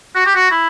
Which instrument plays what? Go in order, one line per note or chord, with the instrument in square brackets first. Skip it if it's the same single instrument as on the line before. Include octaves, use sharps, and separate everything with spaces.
[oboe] F#4
G4
F#4
E4